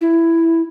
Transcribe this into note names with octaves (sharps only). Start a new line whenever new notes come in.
E4